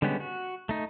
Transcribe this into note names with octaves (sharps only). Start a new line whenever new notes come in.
D3 G3 G#3 B3 C#4
F#4
A3 D#4